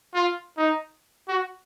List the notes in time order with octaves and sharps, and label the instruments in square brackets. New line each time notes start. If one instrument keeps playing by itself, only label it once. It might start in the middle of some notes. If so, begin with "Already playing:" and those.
[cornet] F4
D#4
F#4